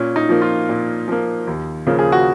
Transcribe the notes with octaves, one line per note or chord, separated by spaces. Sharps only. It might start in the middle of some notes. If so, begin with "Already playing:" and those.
Already playing: A#2 C#4
D#4
F3 A#3
F4
A#2
F3 A#3
D#2
C#3 F3 A#3
G#4
F#4